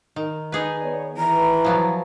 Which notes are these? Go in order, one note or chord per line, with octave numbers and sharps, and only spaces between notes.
D#3
D#4 G#4 B4
B3 C#5 D5
E3 A#5
F3 F#3 B3